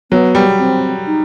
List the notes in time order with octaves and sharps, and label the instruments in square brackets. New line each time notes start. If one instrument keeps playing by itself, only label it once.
[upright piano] F#3 [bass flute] B3
[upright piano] G3
[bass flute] C4
D#4